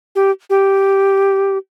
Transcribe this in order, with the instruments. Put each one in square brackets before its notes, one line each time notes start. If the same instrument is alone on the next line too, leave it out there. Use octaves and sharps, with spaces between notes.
[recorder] G4
G4